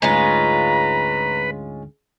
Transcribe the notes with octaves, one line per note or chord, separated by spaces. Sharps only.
D2 G#2 G#3 C#4 F4 B4 A#5